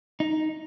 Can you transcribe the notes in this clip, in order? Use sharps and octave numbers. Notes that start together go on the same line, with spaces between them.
D#4